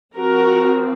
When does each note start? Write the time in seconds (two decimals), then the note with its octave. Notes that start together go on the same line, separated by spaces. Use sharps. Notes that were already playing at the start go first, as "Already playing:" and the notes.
0.16 F3 C4 F#4 A#4